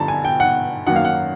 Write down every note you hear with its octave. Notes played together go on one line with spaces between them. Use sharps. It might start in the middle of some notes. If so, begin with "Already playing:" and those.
Already playing: G2 D3 F3 A5 A#5
G#5
G5
F#5
F#2 D#3 F#3 A#3 F#5
F5
F#5